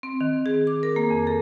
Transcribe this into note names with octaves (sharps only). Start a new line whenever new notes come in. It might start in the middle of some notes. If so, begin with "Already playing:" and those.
C4
D#3
G#4
D6
A#4
A#3
F2
A4